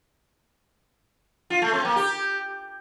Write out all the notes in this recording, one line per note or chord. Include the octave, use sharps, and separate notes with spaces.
F4
A3
C4
A#3
G4